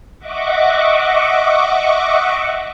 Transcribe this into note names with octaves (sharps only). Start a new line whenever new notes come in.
D#5 E5 F#5 C#6 D6